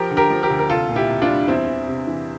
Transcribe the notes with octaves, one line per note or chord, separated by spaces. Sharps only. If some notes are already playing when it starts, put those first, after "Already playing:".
Already playing: F3 G4 A#4
D3
G4 A#4
F3
G4 A#4
D2
A#4
C2 F4 A4
A#2
E4 G4
C2
D4 F4
G3
E2 C4 E4
E3
C3
E3